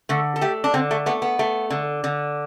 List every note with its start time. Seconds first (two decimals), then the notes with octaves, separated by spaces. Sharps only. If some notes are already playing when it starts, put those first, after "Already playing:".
0.09 D3 A3
0.36 A4
0.41 A3 G4
0.64 D4
0.74 D3 C4
0.91 A3
1.06 A3 B3
1.22 B3
1.39 A3
1.70 D3
2.04 D3